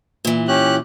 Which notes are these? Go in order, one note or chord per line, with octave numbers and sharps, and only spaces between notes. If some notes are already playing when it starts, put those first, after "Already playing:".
A#2 E3
C#4 G4 F#6